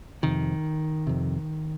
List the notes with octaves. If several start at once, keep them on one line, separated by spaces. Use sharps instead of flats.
F2 C3 D#3
F2 C3